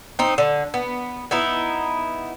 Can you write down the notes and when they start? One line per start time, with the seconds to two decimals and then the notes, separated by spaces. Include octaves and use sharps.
0.19 C4 D#4
0.38 D3
0.74 B3
1.31 B3 D#4 E4